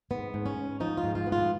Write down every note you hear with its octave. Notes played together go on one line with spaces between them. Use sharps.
G#2 B3
G#2
C#4
G#2
F3 D#4
F4
G#2
F4
B3
F4